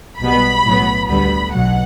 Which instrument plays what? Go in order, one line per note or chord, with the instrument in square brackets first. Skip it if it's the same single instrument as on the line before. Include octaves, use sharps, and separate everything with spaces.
[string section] B1 B2 G3 B3 B5
B1 A2 F#3 B3
D2 D3 G3 B3 B5
B1 B2 F#3 F#5